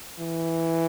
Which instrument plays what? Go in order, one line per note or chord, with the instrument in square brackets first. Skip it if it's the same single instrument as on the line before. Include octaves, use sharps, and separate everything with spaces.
[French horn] E3